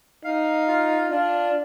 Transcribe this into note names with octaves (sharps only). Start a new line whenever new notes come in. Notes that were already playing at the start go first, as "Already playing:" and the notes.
D#4 F5
F4
D4 F4